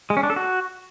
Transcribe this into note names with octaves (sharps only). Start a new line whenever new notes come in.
G#3
C#4
D4
A4
F#4